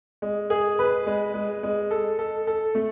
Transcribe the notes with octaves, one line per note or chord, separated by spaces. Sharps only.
G#3
G#4
B4
G#3
G#3
G#3
A4
A4
A4
A3